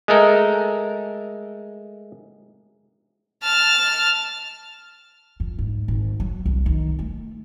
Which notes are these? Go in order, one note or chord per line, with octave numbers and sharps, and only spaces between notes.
G#3 A3 A4 A#4
A5 F6
F2
G#2
G#1
F#3
C2
D#3
A3